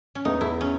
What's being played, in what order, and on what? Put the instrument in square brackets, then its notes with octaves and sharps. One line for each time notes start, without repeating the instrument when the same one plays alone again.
[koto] C#4
[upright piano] E2 [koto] D#4
[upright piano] E2 [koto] E4
[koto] C#4